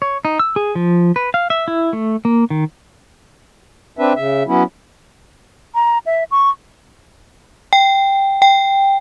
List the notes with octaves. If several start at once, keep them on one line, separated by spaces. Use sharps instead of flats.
C#5
D#4
E6
G#4
F3
B4
F5
E5
E4
A3
A#3
D#3
C4 D4 B4 E5
C#3 E5
F#3 B3 C#4 E4
A#5
E5
C#6
G5
G5